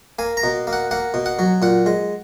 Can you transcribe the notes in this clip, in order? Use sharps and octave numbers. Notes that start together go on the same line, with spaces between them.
A#3 G#5
A#5
B2
A#3
F#5
A#3 F#5
B2
F#5
F#3
A#2 F#5
G#3